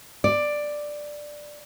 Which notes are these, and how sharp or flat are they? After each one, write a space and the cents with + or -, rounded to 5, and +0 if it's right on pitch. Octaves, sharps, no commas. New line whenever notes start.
D5 +5